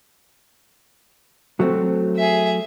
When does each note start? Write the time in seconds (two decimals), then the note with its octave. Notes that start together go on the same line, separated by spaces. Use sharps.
1.60 F#3 A3 C4
2.17 G#4 E5